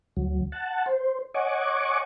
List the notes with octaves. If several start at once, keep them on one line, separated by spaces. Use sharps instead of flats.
D2 F#3
F#5 A5
C5
C#5 D#5 F#5 G#5 C#6 D6